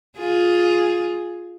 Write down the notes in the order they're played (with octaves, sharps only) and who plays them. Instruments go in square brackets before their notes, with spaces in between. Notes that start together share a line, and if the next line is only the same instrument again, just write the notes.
[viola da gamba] F4 G#4